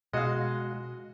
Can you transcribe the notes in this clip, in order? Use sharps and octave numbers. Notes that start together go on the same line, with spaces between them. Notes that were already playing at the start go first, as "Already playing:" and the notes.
B2 G#3 F#4 D#5 F5